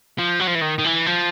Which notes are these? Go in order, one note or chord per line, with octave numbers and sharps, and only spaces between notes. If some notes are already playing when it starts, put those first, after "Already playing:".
F3
F#3
F3
E3
D#3
D#3
E3
F3